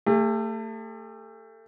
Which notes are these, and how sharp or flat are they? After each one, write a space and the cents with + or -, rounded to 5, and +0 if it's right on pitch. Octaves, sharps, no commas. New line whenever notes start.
A3 +30 G#4 -45